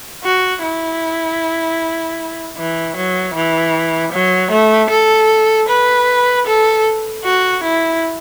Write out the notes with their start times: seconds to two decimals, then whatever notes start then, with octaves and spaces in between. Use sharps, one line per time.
0.24 F#4
0.63 E4
2.57 E3
2.96 F#3
3.34 E3
4.12 F#3
4.51 A3
4.90 A4
5.68 B4
6.47 A4
7.24 F#4
7.63 E4